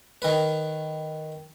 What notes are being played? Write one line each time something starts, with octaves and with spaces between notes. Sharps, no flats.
D#3 B4